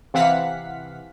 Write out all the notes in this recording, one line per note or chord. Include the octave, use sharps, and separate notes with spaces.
C3 E3 F5 F#5 B6